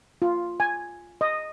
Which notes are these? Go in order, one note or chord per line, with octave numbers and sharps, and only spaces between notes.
F4
G#5
D#5